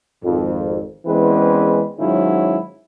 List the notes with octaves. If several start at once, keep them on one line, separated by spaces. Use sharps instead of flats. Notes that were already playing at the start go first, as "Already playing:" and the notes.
G#1 F2
E2 E3 G#3 C4 C#4 B4
G#2 D#3 F#3 C#4 E4 F4